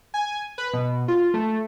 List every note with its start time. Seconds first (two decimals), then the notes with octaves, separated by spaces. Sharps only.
0.14 G#5
0.58 B4
0.73 B2
1.08 F4
1.34 A3